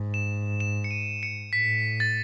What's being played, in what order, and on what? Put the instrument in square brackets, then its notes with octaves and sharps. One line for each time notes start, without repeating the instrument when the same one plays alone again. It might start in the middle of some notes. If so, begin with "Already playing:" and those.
Already playing: [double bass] G#2
[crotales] E7
E7
C#7
D#7
C#7
[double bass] A2 [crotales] B6
[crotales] A6